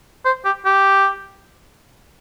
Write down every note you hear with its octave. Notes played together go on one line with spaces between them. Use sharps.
C5
G4
G4